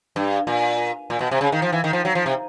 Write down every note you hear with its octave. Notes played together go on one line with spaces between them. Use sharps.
G2
A#2
A#2
B2
C3
C#3
D#3
F3
E3
D#3
F3
F#3
F3
C3